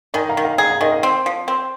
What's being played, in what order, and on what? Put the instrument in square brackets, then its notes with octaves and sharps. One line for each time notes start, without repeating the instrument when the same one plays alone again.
[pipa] D#3 [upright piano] D#5 G#5
[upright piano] F5 A#5
[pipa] D#3
[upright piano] F5 A#5
[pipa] G#4 [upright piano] F5 A#5
[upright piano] F5 A#5
[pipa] D#3 [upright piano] D#5 G#5
[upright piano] F5
[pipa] C4
F3
C4